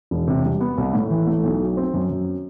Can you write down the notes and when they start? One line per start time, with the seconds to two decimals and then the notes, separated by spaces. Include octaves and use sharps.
0.11 E1
0.28 C3
0.44 G3
0.60 B3
0.78 C2
0.94 A2
1.10 E3
1.27 A3
1.44 B1
1.61 F#3
1.77 C4
1.94 F#2
2.10 F#2